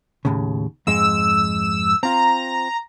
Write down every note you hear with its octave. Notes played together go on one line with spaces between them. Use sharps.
D#2 A2 C#3
F2 G#2 G#3 E6
C4 F4 A#5